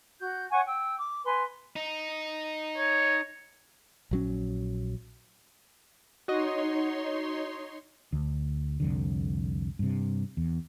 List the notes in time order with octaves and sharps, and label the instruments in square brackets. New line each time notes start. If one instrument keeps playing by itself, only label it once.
[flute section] F#4 G6
C#5 F#5 G#5 C#6
G5 E6
D6
B4 G#5 C6
[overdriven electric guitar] D#4
[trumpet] C#5
[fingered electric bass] A#1 F#3 C#4
[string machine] D#4 C#5 C6 [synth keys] F#4 D#5
[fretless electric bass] D2
C2 F2 D3
G2 C3
E2